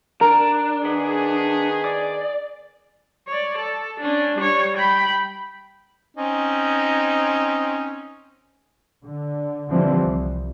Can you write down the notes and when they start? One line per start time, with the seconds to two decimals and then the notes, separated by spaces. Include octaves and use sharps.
0.21 D4 A#4
0.83 D#3 B3 G#4
1.85 D5
3.28 C#5 D5
3.58 A4
4.00 C#4 D4
4.37 G3 C#5
4.78 G5 B5
6.17 C4 C#4 D#4
9.04 D3
9.71 D3 E3 F3 G3 C4
10.04 C2